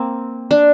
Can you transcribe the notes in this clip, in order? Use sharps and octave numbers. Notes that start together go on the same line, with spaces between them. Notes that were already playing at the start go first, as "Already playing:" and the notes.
Already playing: A#3 C4
D4